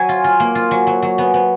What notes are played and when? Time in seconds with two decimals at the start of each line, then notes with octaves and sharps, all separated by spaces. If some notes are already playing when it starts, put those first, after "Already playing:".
Already playing: F#3 G#5
0.09 F4
0.24 F4
0.40 A#3
0.55 F4
0.71 F#3
0.87 F#3
1.03 F#3
1.18 B3
1.34 B3